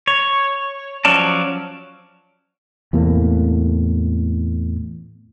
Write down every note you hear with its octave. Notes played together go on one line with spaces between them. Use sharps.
C#5
F3 F#3 C#4 D5 A5
E2 A2 C3 A#3